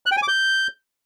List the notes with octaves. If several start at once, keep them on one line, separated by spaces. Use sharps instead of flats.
F#6
G5
G#5
D6
G6